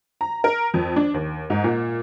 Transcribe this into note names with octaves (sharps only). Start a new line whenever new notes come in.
A#5
A#4
F2
D4
D#2
G#2
A#2